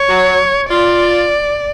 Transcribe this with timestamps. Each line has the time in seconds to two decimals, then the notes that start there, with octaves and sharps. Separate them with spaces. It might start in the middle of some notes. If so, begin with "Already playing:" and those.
Already playing: C#5
0.09 F#3
0.70 F4 D5